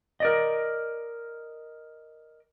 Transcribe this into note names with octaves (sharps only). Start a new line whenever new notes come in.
A#4 D5 D#5